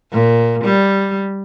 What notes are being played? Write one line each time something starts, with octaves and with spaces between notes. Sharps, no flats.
A#2
G3